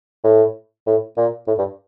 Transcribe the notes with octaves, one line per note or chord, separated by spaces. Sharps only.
A2
A2
A#2
A2
G2